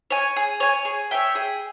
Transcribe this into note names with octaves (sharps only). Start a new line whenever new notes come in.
C#5 G#5
G#4
C#5 G#5
G#4
C#5 E5 G5
G#4